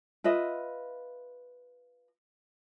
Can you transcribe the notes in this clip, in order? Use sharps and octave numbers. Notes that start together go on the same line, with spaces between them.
F4 B4 D#5 E5